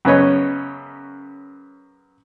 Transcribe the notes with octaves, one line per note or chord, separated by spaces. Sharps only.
F#2 C#3 B3 C#5 D#5